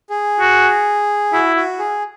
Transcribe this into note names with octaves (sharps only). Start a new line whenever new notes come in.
G#4
F#4
E4 F#4
F#4
G#4